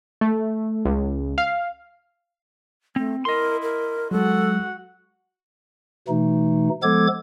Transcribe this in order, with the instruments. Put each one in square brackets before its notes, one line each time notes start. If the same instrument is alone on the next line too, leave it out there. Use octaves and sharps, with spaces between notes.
[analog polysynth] A3
C#2
F5
[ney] A3 [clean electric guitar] C4
[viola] E4 [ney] A#4 [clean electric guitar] D#5 C6
[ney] A#4
[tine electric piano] F#3 G#3 [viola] F#4 F#5 [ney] A4
[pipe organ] B2 E3 A3 D#4
F3 G#3 B3 A4 D6 G#6